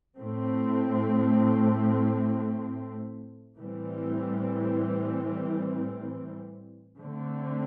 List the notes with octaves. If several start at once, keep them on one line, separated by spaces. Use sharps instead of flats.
A2 A3 C4
A2 E3 G3 C4
D3 A3 C4